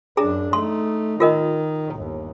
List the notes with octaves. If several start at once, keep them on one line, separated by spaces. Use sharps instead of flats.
F#2 D4 G#4 A#5
A3 D#4 C6
D#3 F4 A#4 D#5
G1 D#2